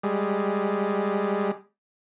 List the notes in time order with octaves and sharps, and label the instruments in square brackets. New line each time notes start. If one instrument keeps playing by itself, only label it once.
[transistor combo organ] G3 G#3